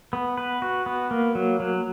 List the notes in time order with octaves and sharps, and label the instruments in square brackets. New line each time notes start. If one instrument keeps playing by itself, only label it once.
[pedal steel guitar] B3
B4
F#4
B3
A#3
F#3
F#3